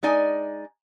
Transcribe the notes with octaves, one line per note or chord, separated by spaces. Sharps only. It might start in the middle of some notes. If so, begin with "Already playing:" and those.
G#3 D#4 D5 G#5